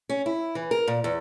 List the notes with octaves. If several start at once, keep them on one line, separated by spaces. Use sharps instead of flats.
C#4
E4
E3
A#4
A#2
E2